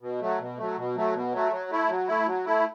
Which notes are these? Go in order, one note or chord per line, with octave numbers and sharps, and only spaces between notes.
B2
F#3 A3
B2
F#3 A3
B2
F#3 A3
B2
F#3 A3
F#3
A3 E4
F#3
A3 E4
F#3
A3 E4